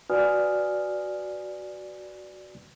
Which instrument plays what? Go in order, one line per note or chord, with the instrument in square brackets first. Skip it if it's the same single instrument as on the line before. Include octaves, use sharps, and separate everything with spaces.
[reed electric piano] F#4 B4 D5 G#5 D#6 F6